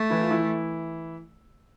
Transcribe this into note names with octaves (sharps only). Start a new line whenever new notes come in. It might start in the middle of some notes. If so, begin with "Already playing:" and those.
Already playing: A3
E3 E4
F4
E3 E4